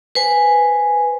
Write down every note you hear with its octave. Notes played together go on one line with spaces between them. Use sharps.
B4 C5 G#5